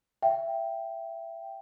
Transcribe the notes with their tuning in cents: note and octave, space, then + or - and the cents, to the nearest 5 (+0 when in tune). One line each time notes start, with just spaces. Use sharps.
E5 +20 G5 -5